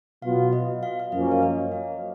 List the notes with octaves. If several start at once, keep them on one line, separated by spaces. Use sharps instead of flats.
B2 F#3 B3 F4 F5
D#5
F5
F5
F#2 F3 A#3 C#4 D#5
C#5
D#5
F5